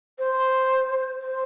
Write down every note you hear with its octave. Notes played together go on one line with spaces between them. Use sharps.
C5
C5